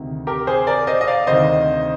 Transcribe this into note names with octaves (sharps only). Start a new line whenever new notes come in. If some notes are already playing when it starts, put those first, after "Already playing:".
Already playing: D2 C3 D#3
G4 A#4
G#4 C5
A#4 D5
C5 D#5
D#5
D5 F5
D2 C3 D#3 C5 D#5